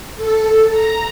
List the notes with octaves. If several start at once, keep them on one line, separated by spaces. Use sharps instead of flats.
A4
A#5